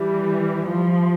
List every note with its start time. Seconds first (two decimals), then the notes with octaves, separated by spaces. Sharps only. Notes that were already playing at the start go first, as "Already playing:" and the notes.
Already playing: E3 G3
0.69 F3